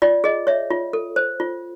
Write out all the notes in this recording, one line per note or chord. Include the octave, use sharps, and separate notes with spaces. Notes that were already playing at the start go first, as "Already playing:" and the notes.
F4 D5
G#4 D#5
C#5 E5
F4
A4
C5
F4